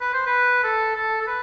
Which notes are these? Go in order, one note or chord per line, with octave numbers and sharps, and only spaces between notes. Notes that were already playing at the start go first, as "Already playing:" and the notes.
B4
C5
B4
A4
A4
A4
B4